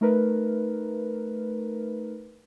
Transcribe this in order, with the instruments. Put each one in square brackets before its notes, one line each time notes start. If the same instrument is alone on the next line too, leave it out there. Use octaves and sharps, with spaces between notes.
[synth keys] A3 D#4 A#4 B4